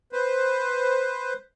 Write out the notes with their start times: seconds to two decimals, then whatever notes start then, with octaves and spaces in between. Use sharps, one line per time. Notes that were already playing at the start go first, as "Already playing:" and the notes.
0.12 B4 C5